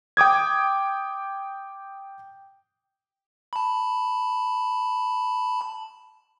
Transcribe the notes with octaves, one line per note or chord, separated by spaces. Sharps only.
G5 D6 D#6 G#6
A5 B5